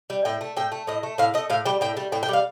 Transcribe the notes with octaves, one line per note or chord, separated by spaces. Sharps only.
G3
A2 G5
A3
A2 G5
A3
A2 D#5
A3
A2 F5
A3 D#5
A2 F5
G3 G5
A2 G5
G3
A2 G5
G5
G3 F5